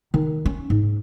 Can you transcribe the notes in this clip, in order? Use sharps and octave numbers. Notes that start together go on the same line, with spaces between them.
D#3
C#4
G#2